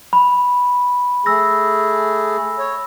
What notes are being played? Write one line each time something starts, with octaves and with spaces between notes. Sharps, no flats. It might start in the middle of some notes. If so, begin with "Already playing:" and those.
B5
A3 G#4 E6 A#6
C#5